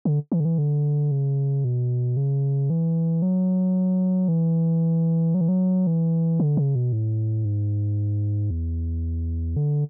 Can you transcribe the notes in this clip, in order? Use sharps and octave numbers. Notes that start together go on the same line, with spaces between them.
D3
E3
D3
E3
D3
C#3
B2
C#3
E3
F#3
E3
F#3
E3
F#3
E3
D3
C#3
B2
A2
G#2
E2
D3